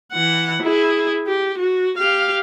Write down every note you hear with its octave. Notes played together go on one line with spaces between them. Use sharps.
E3 F#5
E4 G#4
G4
F#4
G4 F5